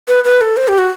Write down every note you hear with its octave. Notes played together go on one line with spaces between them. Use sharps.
B4
B4
A4
C5
G4
F#4